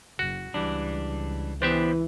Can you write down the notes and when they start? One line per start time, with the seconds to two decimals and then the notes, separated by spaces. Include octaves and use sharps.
0.19 F#1 F#4
0.54 C#2 E3 G3 D4
1.62 E3 B3 D4 G4 B4 C5 E5